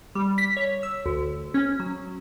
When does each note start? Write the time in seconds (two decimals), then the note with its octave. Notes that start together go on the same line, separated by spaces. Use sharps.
0.15 G3
0.38 B6
0.57 C#5
0.83 E6
1.06 D2
1.54 C#4
1.80 F#3